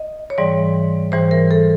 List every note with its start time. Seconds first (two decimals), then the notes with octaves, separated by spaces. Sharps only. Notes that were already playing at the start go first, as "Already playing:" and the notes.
Already playing: D#5
0.30 C#5
0.38 G#2 E3 G3 D5
1.12 G#2 E3 G3 C5
1.31 A#4
1.51 A4